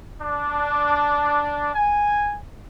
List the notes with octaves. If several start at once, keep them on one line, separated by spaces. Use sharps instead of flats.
D4
G#5